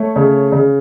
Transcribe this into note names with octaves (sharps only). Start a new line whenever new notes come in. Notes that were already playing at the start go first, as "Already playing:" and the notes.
Already playing: A3 C#5
C#3
C#3